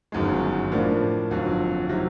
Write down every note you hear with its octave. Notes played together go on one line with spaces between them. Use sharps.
G1 F#2 D#3 G#3
A2 F3 A#3 D4
G1 F2 D3 F#3
C3 D#3 F#3